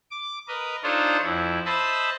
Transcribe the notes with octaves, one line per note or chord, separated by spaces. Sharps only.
D6
A#4 B4 D#5
D4 D#4 F4 A4 C5 C#5
F2 E4
C5 D#5 E5 A5 B5